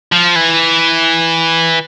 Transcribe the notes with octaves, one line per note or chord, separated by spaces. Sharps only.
F3
E3